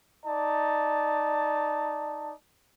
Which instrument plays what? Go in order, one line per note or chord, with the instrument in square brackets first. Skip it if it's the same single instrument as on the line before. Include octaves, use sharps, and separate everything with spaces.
[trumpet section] D#4 D5 A5